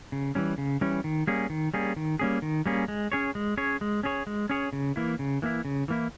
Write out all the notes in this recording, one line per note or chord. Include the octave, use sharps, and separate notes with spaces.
C#3
E3 G3 C#4
C#3
E3 G3 C#4
D#3
G3 A#3 C#4 G#4
D#3
G3 A#3 C#4 G#4
D#3
G3 A#3 C#4 G#4
D#3
G3 A#3 C#4 G#4
G#3
C#4 G#4 C#5
G#3
C#4 G#4 C#5
G#3
C#4 G#4 C#5
G#3
C#4 G#4 C#5
C#3
E3 A#3 E4
C#3
E3 A#3 E4
C#3
E3 A#3 E4